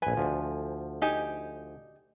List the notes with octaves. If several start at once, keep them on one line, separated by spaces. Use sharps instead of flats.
A#1 B4 G#5
D2 F3
D#4 G4 G#5